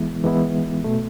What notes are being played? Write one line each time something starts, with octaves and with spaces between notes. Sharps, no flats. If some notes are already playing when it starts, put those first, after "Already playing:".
Already playing: E3 G#3 B3 E4
E3 G#3 B3 E4
B2 A3